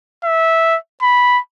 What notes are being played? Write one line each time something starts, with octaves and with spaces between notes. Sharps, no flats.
E5
B5